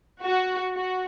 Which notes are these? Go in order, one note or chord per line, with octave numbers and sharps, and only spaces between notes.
F#4
F#4